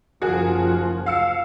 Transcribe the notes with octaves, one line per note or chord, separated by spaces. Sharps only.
F#1 F3 F#4 G#4 A#4
F5 E6 C#7